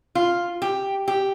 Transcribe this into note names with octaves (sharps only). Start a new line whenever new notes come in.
F4
G4
G4